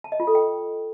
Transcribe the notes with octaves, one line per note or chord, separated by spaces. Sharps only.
A5
D#5
F4
A4
G5